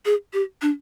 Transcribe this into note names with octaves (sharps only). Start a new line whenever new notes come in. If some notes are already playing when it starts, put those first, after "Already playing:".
G#4
G4
D4